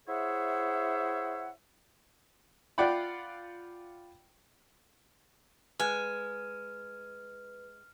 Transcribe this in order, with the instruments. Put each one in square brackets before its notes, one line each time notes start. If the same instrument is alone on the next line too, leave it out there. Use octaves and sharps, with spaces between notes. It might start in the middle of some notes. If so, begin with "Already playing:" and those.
[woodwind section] E4 G#4 C5 C#5 E5 F#5
[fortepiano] F4 D5 F#5 G5 B5
[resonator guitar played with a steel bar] G#3 [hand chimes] B4 [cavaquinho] G#5 [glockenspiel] F6